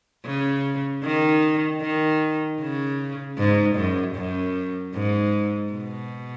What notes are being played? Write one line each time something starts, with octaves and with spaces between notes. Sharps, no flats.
C#3
D#3
D#3
C#3
G#2
F#2
F#2
G#2
B2